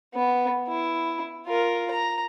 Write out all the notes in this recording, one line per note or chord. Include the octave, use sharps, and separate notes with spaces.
B3
E4
F4 A#4
A#5